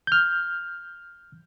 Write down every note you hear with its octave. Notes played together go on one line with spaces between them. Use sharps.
F6 G6